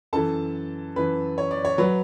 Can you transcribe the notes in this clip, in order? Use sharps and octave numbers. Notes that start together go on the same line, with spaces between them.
F#2 E3 A4 A5
F#2 E3 B4
C#5
D5
C#5
F#3 B4